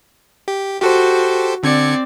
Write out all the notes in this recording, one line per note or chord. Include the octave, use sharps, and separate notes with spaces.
G4
F#4 G4 A4 C5
D3 C4 D5 G#6 C#7